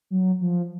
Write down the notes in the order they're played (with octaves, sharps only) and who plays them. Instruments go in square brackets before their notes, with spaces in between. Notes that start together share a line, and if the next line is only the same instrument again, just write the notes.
[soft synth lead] F#3
F3